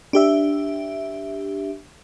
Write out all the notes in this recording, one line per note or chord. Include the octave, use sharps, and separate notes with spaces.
D4 G4 E5